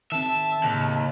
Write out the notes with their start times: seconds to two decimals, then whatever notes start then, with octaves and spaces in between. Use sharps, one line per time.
0.12 D#3 C4 E5 A5
0.64 D#2 A2 C#3